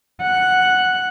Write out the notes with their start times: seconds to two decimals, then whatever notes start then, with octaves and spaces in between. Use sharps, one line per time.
0.22 F#5